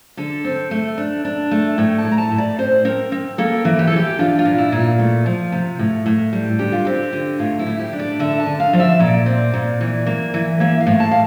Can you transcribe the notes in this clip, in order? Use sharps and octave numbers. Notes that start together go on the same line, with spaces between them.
D3 A4
C4
A3
D4
D4
A3
A2 G5
A5
A2
A#5
A5
A2
D5
C4 C5
C4 A#4
C4
A#3 A4
E3
G4
A4
E3 G4
D4 F4
F4
A#2
E4
A#2
F4
A3
F3
C3
A2
A2
G3
D3 G4
F4
C4 G4
D3
A2 F4
E4
A2
G4
D4
D5
D3 E5
A5
D3
F5
F3 D5
E5
A#2 D5
C4
A#2
E3
A#3
E3
A#3 E5
F5
A2
A5
F5